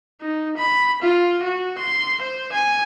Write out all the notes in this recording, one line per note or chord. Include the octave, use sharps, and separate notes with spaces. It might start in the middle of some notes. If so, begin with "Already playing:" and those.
D#4
B5
F4
F#4
C6
C5
G#5